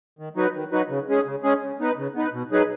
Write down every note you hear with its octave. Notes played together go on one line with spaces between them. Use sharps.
D#3
F#3 D#4 F#4 B4
D#3
F#3 D#4 F#4 B4
C#3
G#3 C#4 G#4
C#3
G#3 C#4 G#4
C#3
B3 D#4 B4
C#3
B3 D#4 B4
B2
F#3 D#4 G#4 B4